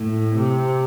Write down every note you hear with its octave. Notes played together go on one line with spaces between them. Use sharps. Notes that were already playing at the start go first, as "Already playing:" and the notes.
Already playing: A2
C3